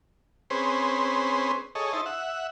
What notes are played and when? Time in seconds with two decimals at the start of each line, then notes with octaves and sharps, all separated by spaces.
0.50 C4 C#4 G#4 B4 C5
1.75 G#4 A4 C#5 D#5
1.93 D#4 E4 C5 A5
2.06 E5 F#5